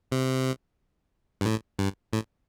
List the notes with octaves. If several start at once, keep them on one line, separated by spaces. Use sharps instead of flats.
C3
G2
A2
G2
A2